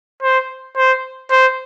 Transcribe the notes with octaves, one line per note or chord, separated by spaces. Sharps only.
C5
C5
C5